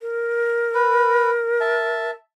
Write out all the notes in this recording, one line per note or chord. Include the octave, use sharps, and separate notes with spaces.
A#4
B4
E5 A5